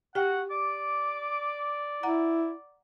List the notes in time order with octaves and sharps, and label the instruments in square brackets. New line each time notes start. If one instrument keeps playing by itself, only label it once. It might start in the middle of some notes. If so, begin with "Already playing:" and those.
[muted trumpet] F#4 [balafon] G4 G5 [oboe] F#5
[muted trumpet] D5 [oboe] D6
[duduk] E4 [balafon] F#5 A#5